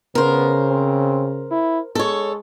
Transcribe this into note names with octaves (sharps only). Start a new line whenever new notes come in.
C#3 B3 A#4 C5
C4
E4
G#3 A4 C#5